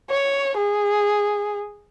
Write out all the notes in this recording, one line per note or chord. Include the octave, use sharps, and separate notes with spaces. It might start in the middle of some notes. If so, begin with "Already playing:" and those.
C#5
G#4